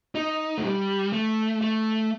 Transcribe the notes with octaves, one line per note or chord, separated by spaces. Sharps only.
D#4
A3
G3
A3
A3